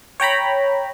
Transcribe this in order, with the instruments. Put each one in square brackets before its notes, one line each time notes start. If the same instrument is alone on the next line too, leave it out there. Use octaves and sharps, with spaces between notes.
[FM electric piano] C#5 G5 A#5 B5